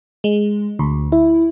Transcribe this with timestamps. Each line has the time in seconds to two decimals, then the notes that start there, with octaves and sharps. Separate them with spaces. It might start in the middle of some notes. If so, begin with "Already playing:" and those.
0.24 G#3
0.79 D2
1.12 E4